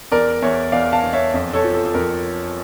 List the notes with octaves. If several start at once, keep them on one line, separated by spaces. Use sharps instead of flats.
E2 A#4 D5
E2 C#5 E5
E2 D5 F5
F5 A5
E2
C#5 E5
F2
A4 C#5
F3
A4
A4
F2 A#4